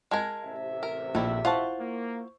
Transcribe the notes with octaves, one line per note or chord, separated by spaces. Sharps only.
G#3 A#4 A5 G#6 A#6
A1 C3 E5
A#4
A#1 D#3 E4
E4 F4 C5 F#5 A5 C#6
A#3